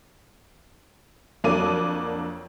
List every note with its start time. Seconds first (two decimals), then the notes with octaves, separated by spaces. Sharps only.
1.44 F2 F#3 A#3 D4 D6 D#7